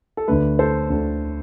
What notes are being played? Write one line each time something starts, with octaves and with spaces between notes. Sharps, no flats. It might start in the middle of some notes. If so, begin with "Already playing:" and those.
A4
D2 D3 A3 B4
A4 C5
D2 D3 A3